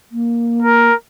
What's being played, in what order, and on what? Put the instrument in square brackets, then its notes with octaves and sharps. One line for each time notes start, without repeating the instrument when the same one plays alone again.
[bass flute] A#3
[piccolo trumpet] A#4